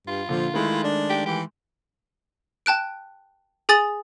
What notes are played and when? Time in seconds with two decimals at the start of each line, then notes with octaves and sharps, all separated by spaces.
0.08 G2 F4
0.29 A#2 D3 F3
0.54 D#3 G#3 A3 E4
0.84 D4
1.09 G4
1.26 E3 G4
2.66 G5 A5 F#6 D7
3.69 G#4 G#5 D#6 A6 F#7